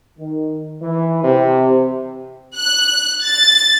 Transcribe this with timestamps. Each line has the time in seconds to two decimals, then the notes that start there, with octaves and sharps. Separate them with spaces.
0.19 D#3
0.82 E3
1.23 C3
2.57 F#6
3.24 A6